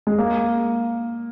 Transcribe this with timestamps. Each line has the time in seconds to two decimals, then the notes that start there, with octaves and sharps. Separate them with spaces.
0.07 G#3
0.18 A#3